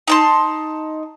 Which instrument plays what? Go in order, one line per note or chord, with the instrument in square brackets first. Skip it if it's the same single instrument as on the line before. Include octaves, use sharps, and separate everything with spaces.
[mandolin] D#4 A5 C6